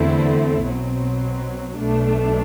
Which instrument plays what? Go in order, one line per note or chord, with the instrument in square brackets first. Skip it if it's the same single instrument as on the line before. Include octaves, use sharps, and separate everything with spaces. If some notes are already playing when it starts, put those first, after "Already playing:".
Already playing: [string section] E2 D3 A3 C4 E4
B1 B2 F#3 C4
B1 B2 A3 D4